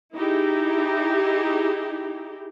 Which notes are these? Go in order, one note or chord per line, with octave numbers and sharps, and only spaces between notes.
D#4 E4 G4 G#4